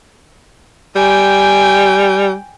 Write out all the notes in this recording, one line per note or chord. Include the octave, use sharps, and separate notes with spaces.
G3 G5 G#5